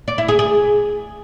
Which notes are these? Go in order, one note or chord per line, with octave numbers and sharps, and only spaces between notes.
D5
E4
G#4
G#4